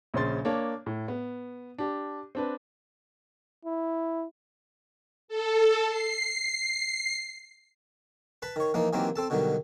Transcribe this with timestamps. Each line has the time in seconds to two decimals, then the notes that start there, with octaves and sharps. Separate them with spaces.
0.14 A#1 C#3 C#4 C5 C6 A6
0.45 A#3 D4 C#5
0.86 A2
1.08 B3
1.78 D4 G4
2.35 C4 D4 B4
3.65 E4
5.28 A4
5.88 C7
8.42 B4 A5 B5
8.56 D#3 C#5
8.74 E3 F3 A#3 D#4
8.93 D#3 E3 F#3 A#3 C4 G4
9.16 C4 A4 A5
9.30 B2 D3 D#3 F#3 G3